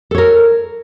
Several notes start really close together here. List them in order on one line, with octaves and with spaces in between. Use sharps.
A4 C#5 A#4